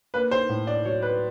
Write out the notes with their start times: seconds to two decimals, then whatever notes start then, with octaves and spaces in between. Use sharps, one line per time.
0.14 A#3 B4
0.31 C5
0.49 A2
0.67 D5
0.85 F#3 C#5
1.02 B4